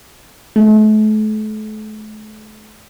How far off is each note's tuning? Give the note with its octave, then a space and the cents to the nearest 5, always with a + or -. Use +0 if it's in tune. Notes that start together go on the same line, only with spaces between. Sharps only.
A3 -40